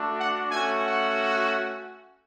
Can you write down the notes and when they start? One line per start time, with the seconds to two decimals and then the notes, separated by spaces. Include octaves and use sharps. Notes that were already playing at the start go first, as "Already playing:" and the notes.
Already playing: A3 D4 F#4
0.17 F#5
0.51 A3 C#4 F#4 G#5
0.84 F#5